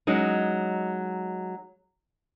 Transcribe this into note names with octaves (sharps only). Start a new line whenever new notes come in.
F#3 G#3 C#4 D#4